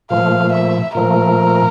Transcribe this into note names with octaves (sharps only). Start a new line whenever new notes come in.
A#2 F3 A3 F5
E5
A#2 F3 A3 A#4